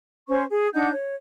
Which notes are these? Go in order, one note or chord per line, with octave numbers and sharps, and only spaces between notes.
C#4 C5 C#6
G#4
D4 D#4 F#5 G6
C#5